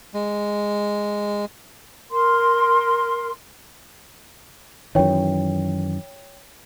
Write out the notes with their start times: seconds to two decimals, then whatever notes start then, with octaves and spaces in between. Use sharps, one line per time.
0.14 G#3
2.11 A#4 C6
4.95 F#2 D#3 E3 C#5 G5